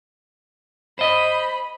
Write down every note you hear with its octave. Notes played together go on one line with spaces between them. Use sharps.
C5 D#5 B5